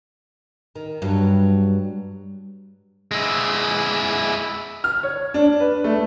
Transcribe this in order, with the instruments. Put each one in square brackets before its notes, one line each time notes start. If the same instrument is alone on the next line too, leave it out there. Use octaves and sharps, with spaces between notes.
[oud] D#3
G2 F#3
[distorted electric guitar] G#3 E4
[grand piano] F6
C#5
D4
B4
A3